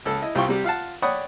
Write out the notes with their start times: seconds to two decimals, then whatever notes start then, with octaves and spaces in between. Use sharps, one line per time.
0.05 C#2 A4 E6
0.22 E4 D#5
0.35 C2 G3 F4 G5 C6 C#6
0.48 C3 G3 G4
0.64 F4 F5 F#5 A5
1.02 C#5 D5 F#5 G5 B5 D#6